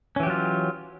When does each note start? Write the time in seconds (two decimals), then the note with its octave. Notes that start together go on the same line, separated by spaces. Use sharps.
0.16 C#4
0.20 E3
0.23 G4
0.27 F#3
0.30 F4